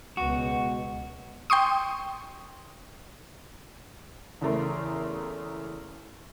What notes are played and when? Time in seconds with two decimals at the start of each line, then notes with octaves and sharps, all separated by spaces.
0.17 C#2 B2 F#4
1.50 G5 C6 C#6 D#6
4.41 E2 C#3 E3 A3 A#4 C6